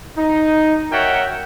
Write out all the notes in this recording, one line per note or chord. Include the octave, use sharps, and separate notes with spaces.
D#4
F#4 A#4 C#5 E5 F#5 G5